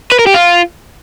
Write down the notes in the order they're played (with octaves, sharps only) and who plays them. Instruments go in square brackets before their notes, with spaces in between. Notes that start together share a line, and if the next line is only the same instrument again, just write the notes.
[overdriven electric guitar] B4
A#4
G4
F4